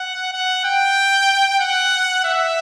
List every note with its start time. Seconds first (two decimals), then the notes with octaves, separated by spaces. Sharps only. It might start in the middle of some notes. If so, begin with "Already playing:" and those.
Already playing: F#5
0.32 F#5
0.65 G5
1.60 F#5
2.24 E5